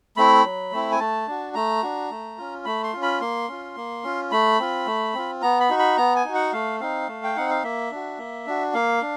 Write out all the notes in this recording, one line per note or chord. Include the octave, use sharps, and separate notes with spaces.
A3 C4 E4 B5
F#3
A3 C4 E4
G#5
A3 A5
D4 F#4
A3 A#5
D4 F#4
A3
C#4 F4
A3 B5
C6
C#4 F4
B5
A#3 C6
C#4 F4
A#3
C#4 F4
A3 B5
C4 F4
A3
C4 F4
B3 A#5
B5
D#4 F#4
B5
B3 A#5
G#5
D#4 F#4
F#5
A3 F5
C4 D#4 F5
A3
G5
C4 D#4 F#5
F5
A#3 E5
D4 F#4
A#3
D4 F#4
A#3 F5
D4